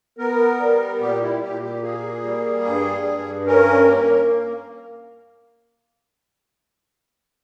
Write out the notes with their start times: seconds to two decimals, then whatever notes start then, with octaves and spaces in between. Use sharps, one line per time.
0.18 B3 A#4
0.59 G3
1.00 A#2 G4
1.22 E4
1.42 A#2 G4
1.62 G4
1.82 A#3 G#4
2.23 G3
2.65 G2
3.05 G2
3.47 C#4 A#4
3.88 A#3